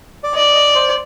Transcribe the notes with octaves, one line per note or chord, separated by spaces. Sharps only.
D5
D5 D#5
D#5
C5